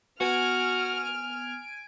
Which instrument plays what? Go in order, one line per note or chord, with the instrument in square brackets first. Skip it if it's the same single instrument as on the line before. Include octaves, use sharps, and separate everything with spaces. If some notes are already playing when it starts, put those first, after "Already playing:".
[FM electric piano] B3 [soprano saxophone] F#4 [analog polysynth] G#5 D7 [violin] F6